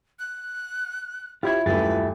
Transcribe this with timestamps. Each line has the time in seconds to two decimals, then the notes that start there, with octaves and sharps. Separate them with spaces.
0.19 F#6
1.43 E4 F4 G4 C#5 G#6
1.66 D#1 F#2 A3 B4 A6